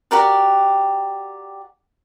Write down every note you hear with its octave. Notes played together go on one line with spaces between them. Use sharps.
F#4 G4 A#4 D5